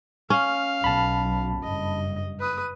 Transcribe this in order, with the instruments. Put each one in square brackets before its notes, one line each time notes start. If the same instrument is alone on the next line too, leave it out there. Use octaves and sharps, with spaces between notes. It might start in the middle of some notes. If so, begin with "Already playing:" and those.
[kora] C#4 [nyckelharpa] F5
[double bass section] B1 [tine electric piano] A5 B5
[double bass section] F#1 G2 [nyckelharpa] D#5
[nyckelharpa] B4 D#6